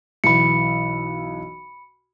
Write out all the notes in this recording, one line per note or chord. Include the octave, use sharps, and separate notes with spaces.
B1 E3 B5 C#7